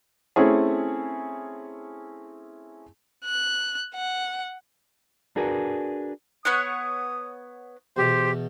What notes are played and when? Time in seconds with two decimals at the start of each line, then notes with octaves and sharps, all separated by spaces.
0.36 A3 C4 C#4 E4 G#4
3.25 F#6
3.95 F#5
5.36 D4 F#4 G#4 A#4 B4
6.45 B3 C#5 F#5 D#6
7.97 E2 B2 G4 C5